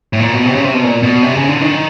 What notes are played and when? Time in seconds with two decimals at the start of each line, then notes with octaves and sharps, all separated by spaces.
0.13 A2
0.20 A#2
0.33 B2
0.45 C3
0.55 C#3
0.64 C3
0.74 B2
0.84 A#2
1.03 B2
1.23 C3
1.35 C#3
1.49 D3
1.61 D#3